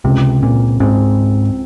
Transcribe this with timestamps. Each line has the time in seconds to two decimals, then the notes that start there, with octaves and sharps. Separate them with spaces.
0.04 C#2 C3
0.42 A#2 C4
0.80 G#2 C4